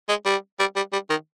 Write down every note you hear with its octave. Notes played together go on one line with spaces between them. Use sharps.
G#3
G3
G3
G3
G3
D#3